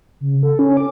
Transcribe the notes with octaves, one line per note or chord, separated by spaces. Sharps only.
C#3
A4
C#4
D6